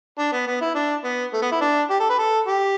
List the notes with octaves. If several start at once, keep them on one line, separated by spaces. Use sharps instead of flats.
D4
B3
B3
E4
D4
B3
A3
B3
E4
D4
G4
A4
B4
A4
G4